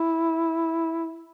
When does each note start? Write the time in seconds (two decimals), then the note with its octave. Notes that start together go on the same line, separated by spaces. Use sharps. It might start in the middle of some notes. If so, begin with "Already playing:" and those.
Already playing: E4